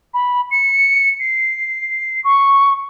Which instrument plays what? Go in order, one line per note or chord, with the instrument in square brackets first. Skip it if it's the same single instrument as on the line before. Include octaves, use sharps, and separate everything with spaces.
[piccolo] B5
C#7
C7
C#6